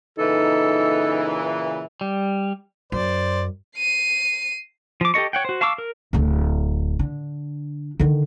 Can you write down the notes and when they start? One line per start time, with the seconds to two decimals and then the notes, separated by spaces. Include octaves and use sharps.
0.19 A#2 C#3 E3 D#4 A4
2.01 G3
2.92 F#2 C5 D5
3.77 C7 D#7
5.01 F3 D6
5.14 G4 A4 D#5 C#6
5.33 C#5 F#5 G5
5.45 F#4 C5
5.61 F5 A5 C#6 D6 E6
5.78 A#4
6.13 D1 D2
6.99 D3
8.00 D3 D#3